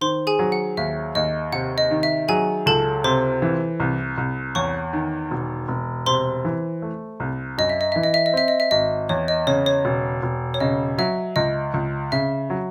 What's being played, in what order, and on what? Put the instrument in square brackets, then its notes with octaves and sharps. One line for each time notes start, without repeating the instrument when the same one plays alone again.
[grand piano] D#3 [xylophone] C5 C6
[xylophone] G#4 G#5
[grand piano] F#3
[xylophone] F#5
[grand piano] D#2 [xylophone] E5
[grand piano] D#2 [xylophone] D#5
[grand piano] C3 [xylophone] F#5
[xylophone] D#5
[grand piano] D#3
[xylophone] E5
[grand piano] F#3 [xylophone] G#4 G#5
[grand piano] C#2 [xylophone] A4 A5
[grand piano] C3 [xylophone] C5 C6
[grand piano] E3
C2
C2
[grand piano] E2 [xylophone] C#5 C#6
[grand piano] D#3
E1
E1
[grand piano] C3 [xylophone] C5 C6
[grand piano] E3
A3
C2
[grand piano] F#2 [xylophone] D#5
[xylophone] E5
D#5
[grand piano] E3 [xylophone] E5
[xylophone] D#5
E5
D#5
[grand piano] C4 [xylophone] E5
[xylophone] D#5
E5
[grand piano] G#1 [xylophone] D#5
[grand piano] E2 [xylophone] C#5
[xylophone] D#5
[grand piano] C#3 [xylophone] C#5
[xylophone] C#5
[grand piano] E1
E1
[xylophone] C#5
[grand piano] C#3 [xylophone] D#5
[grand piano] F#3 [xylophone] E5
[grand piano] C#2 [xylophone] D#5
[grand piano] C#2
[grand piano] C#3 [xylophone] E5
[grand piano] F#3